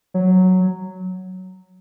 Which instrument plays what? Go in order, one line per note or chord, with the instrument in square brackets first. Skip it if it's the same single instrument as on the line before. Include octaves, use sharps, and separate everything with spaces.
[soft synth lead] F#3